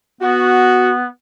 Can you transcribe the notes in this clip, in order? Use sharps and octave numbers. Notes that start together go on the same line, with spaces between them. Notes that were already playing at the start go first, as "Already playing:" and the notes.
B3 F#4